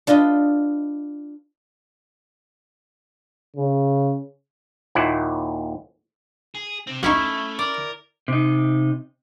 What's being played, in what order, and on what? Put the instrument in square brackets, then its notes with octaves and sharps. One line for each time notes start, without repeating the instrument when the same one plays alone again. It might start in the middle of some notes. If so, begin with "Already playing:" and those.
[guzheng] D4 F4 B4 D#5
[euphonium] C#3
[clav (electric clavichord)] D#2 A#2 E4 F#5
[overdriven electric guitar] G#4
C3 C4
[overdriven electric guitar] A3 [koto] C#4 E4 [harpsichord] D#4 F#4
[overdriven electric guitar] A#4 [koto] D5
[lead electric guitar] C3 D#4